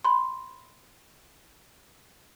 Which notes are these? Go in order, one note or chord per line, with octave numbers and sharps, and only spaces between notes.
B5 C6